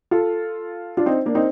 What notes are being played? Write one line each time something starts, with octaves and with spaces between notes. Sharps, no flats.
F4 A4
D4 F4
C4 D#4
A#3 D4
C4 D#4